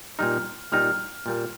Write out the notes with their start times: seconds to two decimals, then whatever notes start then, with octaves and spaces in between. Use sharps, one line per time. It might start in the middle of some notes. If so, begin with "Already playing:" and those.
0.19 A#2 G3 D#4 F6
0.72 A#2 G3 D#4 F6
1.26 A#2 G3 A#3